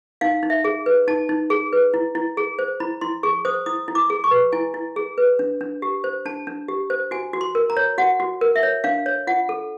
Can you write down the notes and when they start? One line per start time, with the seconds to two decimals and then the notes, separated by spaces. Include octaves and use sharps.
0.21 D#4 F5
0.43 D#4
0.50 E5
0.64 G#4
0.86 B4
1.08 D#4 A5
1.29 D#4
1.50 G#4
1.73 B4
1.94 E4
2.15 E4
2.37 G#4
2.59 C5
2.80 E4 B5
3.01 E4 C6
3.23 G#4 C#6
3.45 C5 D#6
3.66 E4 D#6
3.88 E4
3.95 D6
4.10 G#4
4.24 C#6
4.31 B4
4.52 E4 G#5
4.74 E4
4.96 G#4
5.18 B4
5.39 D4
5.61 D4
5.82 G4
6.04 C5
6.25 D4 A5
6.47 D4
6.68 G4
6.90 C5
7.11 F#4 G#5
7.33 F#4
7.41 C6
7.55 A#4
7.70 A#5
7.77 C#5
7.98 F#4 F#5
8.20 F#4
8.41 A#4
8.56 E5
8.63 C#5
8.84 D4 F5
9.06 C#5
9.27 F4 F#5
9.49 A4